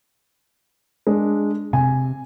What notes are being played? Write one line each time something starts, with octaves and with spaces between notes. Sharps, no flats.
G#3 D4
C3 G#5